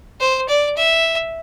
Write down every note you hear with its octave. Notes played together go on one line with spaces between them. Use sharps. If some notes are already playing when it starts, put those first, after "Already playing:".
C5
D5
E5